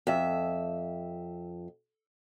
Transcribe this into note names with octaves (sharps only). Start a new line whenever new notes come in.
F2 E5